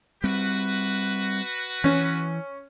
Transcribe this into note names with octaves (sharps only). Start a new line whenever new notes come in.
G3 C4 F#4 B4
E3 C#4